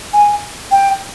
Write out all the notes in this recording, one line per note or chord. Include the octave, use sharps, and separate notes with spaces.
G#5
G5